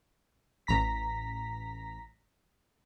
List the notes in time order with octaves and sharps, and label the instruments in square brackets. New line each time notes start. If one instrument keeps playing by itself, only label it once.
[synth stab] A1 A#5 A#6 B6